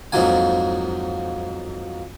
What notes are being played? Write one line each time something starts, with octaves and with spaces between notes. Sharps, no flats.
F2 G#2 F3 F#3 A#3 G#5